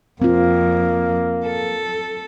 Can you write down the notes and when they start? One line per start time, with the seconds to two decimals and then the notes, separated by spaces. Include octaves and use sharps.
0.22 F2 A#3 C4 F4
1.45 A4